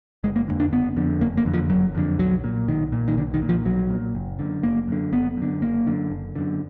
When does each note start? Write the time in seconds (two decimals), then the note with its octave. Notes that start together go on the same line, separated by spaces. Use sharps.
0.24 F#1 G#3
0.36 A#3
0.48 F2 D3
0.60 D4
0.72 F#1 B3
0.97 F2 D3
1.21 F#1 A#3
1.37 A#3
1.45 F2 D3
1.54 F3
1.70 F#1 F#3
1.95 F2 D3
2.18 B1 F#3
2.44 A#2
2.68 B1 D#3
2.92 A#2
3.08 D#3
3.17 B1 D3
3.34 D#3
3.42 A#2
3.49 F3
3.66 B1 F#3
3.90 A#2
4.15 F#1
4.39 F#2 D3
4.63 F#1 A#3
4.88 F#2 D3
5.12 F#1 B3
5.37 F#2 D3
5.61 F#1 A#3
5.87 F#2 D3
6.10 F#1
6.35 F#2 D3